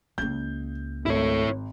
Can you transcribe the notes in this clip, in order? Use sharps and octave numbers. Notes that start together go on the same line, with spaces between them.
C#2 A#3 G6
G#1 A3 E4 C#5